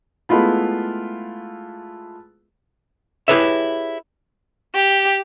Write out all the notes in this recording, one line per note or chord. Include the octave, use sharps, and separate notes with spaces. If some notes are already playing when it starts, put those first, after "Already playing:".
G#3 A3 B3 E4 F4 B5
E4 G4 G#4 B4 C#5 E5
G4